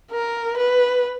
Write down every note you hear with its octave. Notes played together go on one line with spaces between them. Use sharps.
A#4
B4